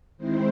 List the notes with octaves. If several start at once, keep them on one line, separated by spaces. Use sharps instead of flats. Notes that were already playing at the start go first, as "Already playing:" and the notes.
D#3 G#3 C4 E4 C5